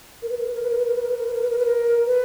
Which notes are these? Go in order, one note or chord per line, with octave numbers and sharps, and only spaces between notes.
A#4
B4
A#4
B4
A#4
B4
A#4
B4
A#4
B4
A#4
B4
A#4
B4
A#4
B4
A#4
B4
A#4
B4